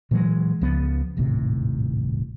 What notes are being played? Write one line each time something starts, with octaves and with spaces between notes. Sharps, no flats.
A#2 E3 F#3 G#3
C#2 F3 B3
D#1 G#1 A2 C3